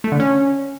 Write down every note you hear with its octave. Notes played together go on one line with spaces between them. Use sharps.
A3
D3
C#4